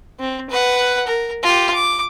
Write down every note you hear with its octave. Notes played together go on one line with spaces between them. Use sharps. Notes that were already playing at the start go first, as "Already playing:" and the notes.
C4
B4 F#5
A#4
F4 G4
D6